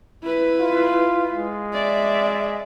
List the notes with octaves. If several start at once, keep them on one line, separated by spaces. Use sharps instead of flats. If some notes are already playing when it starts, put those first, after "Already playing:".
E4 B4
F4
G#3
D5 E5